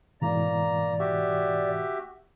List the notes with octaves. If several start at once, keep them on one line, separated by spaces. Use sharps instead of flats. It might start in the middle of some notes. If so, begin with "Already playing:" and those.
G#2 B2 E3 A#3 D5 A#5
F#4 G4 E5